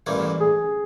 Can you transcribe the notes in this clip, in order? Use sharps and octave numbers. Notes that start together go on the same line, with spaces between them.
A1 G2 E3 G3 A#3
G#4